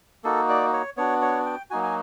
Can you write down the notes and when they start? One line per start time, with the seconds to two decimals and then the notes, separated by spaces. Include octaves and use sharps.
0.24 A#3 D#4 F#4 A4
0.49 D5
0.73 C#5
0.97 B3 D4 F#4 C#5
1.22 C#5
1.45 G5
1.70 F#3 A#3 D#4 F#4 G#5
1.83 G#5